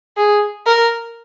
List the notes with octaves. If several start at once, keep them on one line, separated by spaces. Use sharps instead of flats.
G#4
A#4